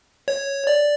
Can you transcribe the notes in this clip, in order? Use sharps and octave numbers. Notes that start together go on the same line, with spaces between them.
C#5
D5